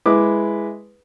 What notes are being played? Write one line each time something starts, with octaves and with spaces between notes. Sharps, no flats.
G#3 E4 B4 D6